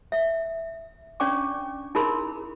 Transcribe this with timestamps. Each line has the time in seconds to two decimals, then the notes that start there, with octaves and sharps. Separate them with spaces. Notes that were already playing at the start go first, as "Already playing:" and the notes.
0.12 E5
1.20 C#4 D4 D5 G5 C#6 D6
1.95 D#4 E4 G#4 A#4 B5 C6